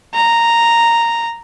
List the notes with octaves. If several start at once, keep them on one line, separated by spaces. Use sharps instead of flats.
A#5